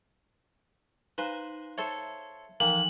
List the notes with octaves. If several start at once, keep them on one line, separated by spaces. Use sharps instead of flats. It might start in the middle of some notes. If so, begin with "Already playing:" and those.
D#4 B4 C5 F5 A#5
A4 C5 C#5 E5
E3 F3 A#3 D#4 F#7